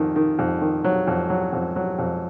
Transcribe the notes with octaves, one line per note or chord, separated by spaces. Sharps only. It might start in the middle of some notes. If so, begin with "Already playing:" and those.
Already playing: F2 D#3
D#3
F2
D#3
F#3
F2
F#3
F2
F#3
F2